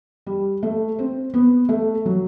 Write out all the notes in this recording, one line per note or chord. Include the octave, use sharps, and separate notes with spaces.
G3
A3
C4
B3
A3
F#3